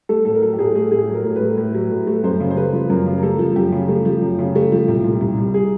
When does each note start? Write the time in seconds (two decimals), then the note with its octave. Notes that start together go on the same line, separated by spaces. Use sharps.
0.09 A3 A4
0.25 A2 A4
0.34 A#4
0.42 F#3 A4
0.53 G4
0.59 A2 G#4
0.75 A3 G#4
0.91 A2 G#4
1.08 F#3
1.13 A#4
1.25 A2
1.36 B4
1.41 A3
1.58 A2
1.74 F#3
1.91 A2
2.07 A3
2.24 F#2 C5
2.40 C#3
2.50 C5
2.57 A3 B4
2.73 F3
2.90 F#2 A#4
3.06 C#3
3.18 A#4
3.23 A3 A4
3.39 F3
3.56 F#2 G4
3.72 C#3
3.89 A3
4.05 F3
4.22 F#2
4.39 C#3
4.56 A3
4.72 F3
4.88 C2
5.04 A#2
5.21 C2
5.38 G3
5.54 G#4